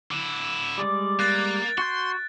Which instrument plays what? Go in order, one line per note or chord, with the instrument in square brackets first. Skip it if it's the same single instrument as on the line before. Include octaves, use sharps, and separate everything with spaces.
[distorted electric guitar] D3 E4
[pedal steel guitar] G3 G#3 D5
[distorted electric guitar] A#3 [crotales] F#6 A6 D7
[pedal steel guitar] F#4 G6 [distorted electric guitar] C6